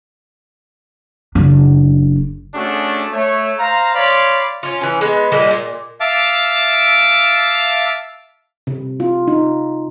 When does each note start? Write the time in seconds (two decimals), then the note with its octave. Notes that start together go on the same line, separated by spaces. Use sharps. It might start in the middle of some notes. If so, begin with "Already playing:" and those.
1.35 F#1 D4
2.55 A3 C#4 D4 F#4 G#4
3.13 A3 C#5
3.59 C5 F5 A#5
3.95 C#5 D5 F5 B5 C6
4.63 C#4 F4
4.81 E3 C#4
5.01 G#3 B3 B4
5.32 A#2 G3 G#3 A#3
5.51 A#2
6.00 E5 F5 A5 D6
8.67 C3
9.00 F4
9.27 D#4